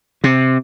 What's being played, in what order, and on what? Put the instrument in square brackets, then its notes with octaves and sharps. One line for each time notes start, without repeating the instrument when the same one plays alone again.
[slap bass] C3